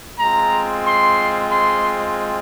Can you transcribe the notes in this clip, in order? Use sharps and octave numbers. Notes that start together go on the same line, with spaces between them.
G#3 C4 F4 A#5
C6
C6